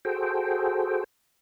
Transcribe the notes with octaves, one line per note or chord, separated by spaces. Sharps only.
F#4 G#4 A4 C5 G5